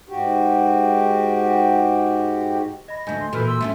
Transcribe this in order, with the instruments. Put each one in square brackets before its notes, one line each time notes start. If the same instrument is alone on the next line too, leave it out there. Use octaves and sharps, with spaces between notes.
[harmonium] G#2 F#4 G4
[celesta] D#5 B5 [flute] A#6
[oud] D2 A3 [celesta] D#5 G#5 G6
[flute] C6
[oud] A#2 E3 [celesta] F#4 F6 G6 [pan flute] A4 [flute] B4
[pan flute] C6 [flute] E6
[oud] A3 C4 C#4 [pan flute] E5